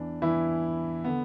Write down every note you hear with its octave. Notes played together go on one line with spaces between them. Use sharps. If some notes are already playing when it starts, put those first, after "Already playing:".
Already playing: E2 E3 D4
E2 E3 E4
D3 B3